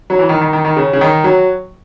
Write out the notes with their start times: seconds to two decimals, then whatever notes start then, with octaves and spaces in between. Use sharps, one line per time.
0.10 F#3
0.19 E3
0.29 D#3
0.41 D#3
0.53 D#3
0.65 D#3
0.77 C#3
0.93 C#3
1.01 D#3
1.24 F#3